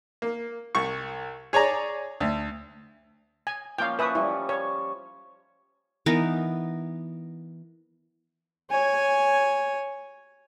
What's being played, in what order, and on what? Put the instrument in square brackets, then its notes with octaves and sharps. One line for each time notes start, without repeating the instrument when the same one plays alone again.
[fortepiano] A#3
C2 C#6
G#4 C#5 D5 A#5
D2
[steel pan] G#5
[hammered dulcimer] F3 A#3 C#4 [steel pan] F5 G5
[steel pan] B4 E5 D#6 [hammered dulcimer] G#5 A5 C#6
[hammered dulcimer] F3 G3 [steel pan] E4
[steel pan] C#5 [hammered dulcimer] A5 C#6
[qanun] E3 B3 D#4 A#4
[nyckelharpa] C#5 G#5